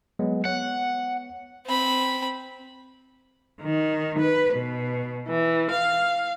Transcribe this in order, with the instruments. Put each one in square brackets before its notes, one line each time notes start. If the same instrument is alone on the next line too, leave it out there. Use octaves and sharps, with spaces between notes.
[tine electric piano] F#3 G#3 B3
[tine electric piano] B3 C#5 [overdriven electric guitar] F#5
[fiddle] C4 B5
[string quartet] D#3
B4
B2
E3
F5